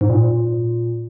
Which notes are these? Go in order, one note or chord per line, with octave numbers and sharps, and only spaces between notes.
G#2
A#2